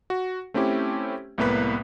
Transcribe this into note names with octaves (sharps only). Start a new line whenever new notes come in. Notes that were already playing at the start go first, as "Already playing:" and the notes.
F#4
A3 C4 C#4 E4 G4
C2 A2 A#3 B3 B4 B6